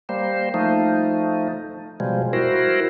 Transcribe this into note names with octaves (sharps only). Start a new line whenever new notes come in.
G3 A#3 C5
F3 A3 D#4
B2 F3 G3 G#3
E4 F#4 A#4 C5